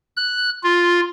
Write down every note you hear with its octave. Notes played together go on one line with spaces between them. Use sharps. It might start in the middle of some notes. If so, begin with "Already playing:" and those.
F#6
F4